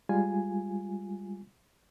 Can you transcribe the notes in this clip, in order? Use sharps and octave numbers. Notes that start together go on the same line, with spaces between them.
G3 G#3 F4 G#5